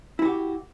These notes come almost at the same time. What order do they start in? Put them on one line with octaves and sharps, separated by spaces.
E4 F#4 G4